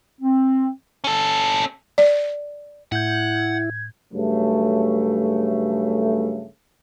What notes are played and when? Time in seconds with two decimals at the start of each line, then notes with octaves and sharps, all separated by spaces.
0.21 C4
1.04 C#4 A4
1.98 D5
2.92 A2 E4 F#5 G6 G#6
4.13 G2 C#3 F#3 A3